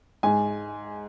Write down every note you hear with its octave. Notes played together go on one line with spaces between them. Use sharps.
G#2 G#5